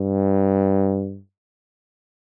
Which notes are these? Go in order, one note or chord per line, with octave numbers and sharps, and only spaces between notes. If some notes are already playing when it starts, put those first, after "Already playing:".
Already playing: G2